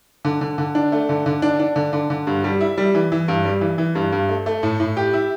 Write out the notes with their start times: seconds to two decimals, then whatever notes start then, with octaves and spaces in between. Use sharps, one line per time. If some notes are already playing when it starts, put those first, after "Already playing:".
0.25 D3
0.41 D3
0.58 D3
0.75 D4
0.92 A3
1.09 D3
1.26 D3
1.42 D4
1.59 D4
1.76 D3
1.93 D3
2.10 D3
2.27 G2
2.44 G3
2.61 E4
2.78 G3
2.95 E3
3.12 E3
3.28 G2
3.45 G3
3.61 E3
3.78 E3
3.95 G2
4.12 G2
4.29 A3
4.46 A3
4.63 A2
4.80 A2
4.97 G4
5.13 E4